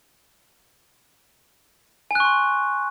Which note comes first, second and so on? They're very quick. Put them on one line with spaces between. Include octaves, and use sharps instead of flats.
G#5 F#6 C#6 C6